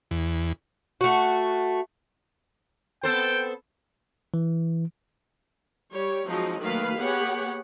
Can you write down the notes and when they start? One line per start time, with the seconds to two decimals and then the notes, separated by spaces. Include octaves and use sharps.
0.11 E2
1.01 A3 F#4
3.03 B3 A4 C5 G5
4.34 E3
5.93 G3 G4 C#5
6.28 F3 F#3 G#3 C4 D#4
6.62 D#3 F#3 A3 A#3 B4 F5
6.98 A#3 B3 G4 G#4 C#5 F#5